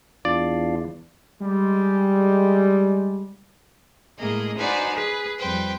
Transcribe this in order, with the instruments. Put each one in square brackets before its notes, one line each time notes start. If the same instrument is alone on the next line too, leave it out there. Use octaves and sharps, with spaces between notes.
[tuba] E2 [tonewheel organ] D4 F4 F5 [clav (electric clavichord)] D5
[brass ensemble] G3 G#3
[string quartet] A2 G#3 A#3 G#4 D#5
D#4 F#4 B4 C5 D5 G#5
G#4 B4
F2 G3 B4 C5 G5